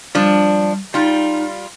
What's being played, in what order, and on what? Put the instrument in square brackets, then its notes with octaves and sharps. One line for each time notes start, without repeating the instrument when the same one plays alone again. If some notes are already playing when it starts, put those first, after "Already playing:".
[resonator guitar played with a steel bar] F3 D4 [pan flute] G3
[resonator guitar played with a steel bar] G3 F4 [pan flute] D#4